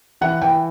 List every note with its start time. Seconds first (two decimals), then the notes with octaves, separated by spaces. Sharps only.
0.21 E3 F#5
0.42 E3 G5